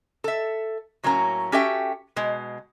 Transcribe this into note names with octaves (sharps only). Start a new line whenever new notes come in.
A4 E5
A2 F#3 A#3 C#4 A#5
C#4 F#4 G4 A4 E5 G5
B2 G#3